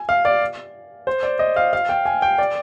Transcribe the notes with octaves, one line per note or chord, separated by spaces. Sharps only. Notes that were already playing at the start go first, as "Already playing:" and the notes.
Already playing: G#5
F5
D5
C5
D5
D#5
F5
F5
G5
G#5
G5
D5